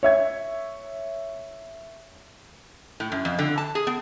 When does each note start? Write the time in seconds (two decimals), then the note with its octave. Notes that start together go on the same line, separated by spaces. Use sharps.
0.03 C#5 E5 G#6
3.00 A2
3.12 F#2
3.25 F2
3.39 D3
3.58 A5
3.75 G#4
3.87 B3